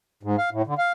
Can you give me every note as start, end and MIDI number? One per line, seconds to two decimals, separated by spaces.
0.23 0.36 44
0.38 0.50 77
0.51 0.62 45
0.67 0.74 50
0.78 0.92 77